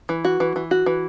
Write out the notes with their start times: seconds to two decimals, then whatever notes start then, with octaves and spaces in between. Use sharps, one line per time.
0.09 E3
0.25 F#4
0.40 E3
0.56 E3
0.71 F#4
0.86 E3